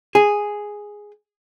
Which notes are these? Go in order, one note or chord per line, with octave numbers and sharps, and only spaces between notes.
G#4